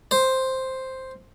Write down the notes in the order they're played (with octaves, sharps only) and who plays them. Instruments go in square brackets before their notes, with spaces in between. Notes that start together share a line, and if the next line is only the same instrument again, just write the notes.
[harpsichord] C5